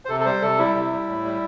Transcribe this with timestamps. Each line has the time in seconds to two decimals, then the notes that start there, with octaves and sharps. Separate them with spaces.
0.05 C5
0.09 C3 A4
0.20 A4
0.25 G3 C5
0.42 C3 A4
0.58 G3 E4
0.75 C3
0.92 G3
1.09 A2
1.25 G3